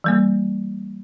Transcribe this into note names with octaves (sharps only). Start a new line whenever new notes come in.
E3 G3 A#3